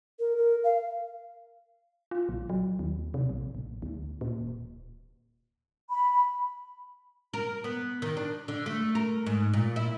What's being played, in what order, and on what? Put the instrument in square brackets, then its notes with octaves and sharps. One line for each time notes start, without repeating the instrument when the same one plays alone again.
[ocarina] A#4
A#4
F5
[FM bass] F4
A#1
F#3
D#2
C3
A#1
A1
D2
A#2
D1
[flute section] B5
[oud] A#4
B3
D#3
D4
D3
A3
A#4
G#2
A#2
E4